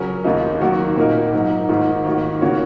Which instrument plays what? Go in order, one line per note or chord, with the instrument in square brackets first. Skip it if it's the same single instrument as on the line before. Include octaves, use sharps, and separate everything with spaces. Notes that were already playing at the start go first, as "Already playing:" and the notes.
Already playing: [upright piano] C#3 F#3 C#4 A#4 C#5
D#2 C#3 A#3 D#4
D#3 F#3 A#3 F#4
A#2 A#3 D#4 A#4
G#2 F#3 D#4
G#2 D#3 A#3 D#4
D#3 A#3 F#4
C#3 A#3 F#4 C#5